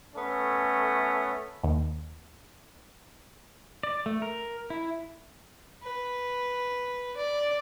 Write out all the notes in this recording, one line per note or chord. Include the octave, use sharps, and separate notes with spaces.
A3 B3 C#4 A4
D#2
D5
A3
A#4
E4
B4
D5